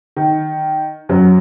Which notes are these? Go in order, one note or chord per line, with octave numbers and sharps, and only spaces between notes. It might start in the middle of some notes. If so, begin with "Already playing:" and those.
D#3
F#2 F#3